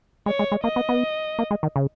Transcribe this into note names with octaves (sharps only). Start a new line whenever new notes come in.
G#3 C#5
G#3
G#3
A#3 D#5
B3
B3
A#3
G#3
D#3
C#3